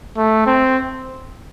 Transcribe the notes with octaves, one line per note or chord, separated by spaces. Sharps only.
A3
C4